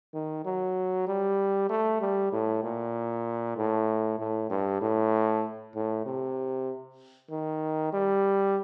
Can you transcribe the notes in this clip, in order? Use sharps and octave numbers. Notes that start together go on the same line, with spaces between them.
D#3
F#3
G3
A3
G3
A2
A#2
A2
A2
G2
A2
A2
C3
D#3
G3